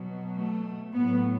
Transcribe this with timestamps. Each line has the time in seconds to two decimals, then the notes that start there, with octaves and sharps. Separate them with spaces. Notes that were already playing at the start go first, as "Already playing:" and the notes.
Already playing: B2 F#3
0.36 A3
0.94 A2 F#3 B3